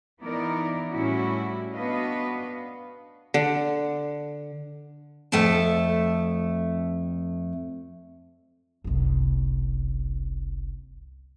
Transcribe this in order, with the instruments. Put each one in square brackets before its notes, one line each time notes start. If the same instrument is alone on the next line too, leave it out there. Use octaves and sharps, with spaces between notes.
[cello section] E3 B3 D#4 E4 A#4 D5
A2 G3 C#4 E4 F#4
B3 D4 F#4 B4 D#5 F5
[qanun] D3
[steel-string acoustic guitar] F2 A3 E5 G5 A5
[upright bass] F#1 C2